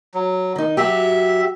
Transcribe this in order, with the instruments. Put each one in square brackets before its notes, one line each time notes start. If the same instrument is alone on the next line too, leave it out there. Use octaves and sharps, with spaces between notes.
[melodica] F#3
[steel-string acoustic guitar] D#3 D#4
[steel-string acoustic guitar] F#3 F#4 G4 [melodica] E5